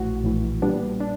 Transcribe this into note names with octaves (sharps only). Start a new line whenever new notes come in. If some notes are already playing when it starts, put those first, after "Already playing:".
Already playing: A#1 A2 E3 F#4
A#1 A2 E3
A#2 G3 B3 D4
D4